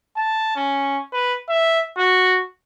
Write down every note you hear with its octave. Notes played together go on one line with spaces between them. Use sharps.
A5
C#4
B4
E5
F#4